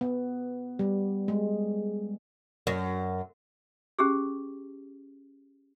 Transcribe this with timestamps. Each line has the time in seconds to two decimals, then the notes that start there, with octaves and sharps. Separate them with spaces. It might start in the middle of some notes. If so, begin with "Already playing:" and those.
0.01 B3
0.79 G3
1.28 G#3
2.67 F#2
3.99 C#4 G4 G#4